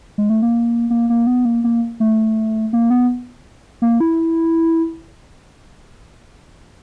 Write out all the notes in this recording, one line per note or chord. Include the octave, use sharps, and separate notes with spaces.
G#3
A3
A#3
A#3
A#3
B3
A#3
A#3
A3
A#3
B3
A#3
E4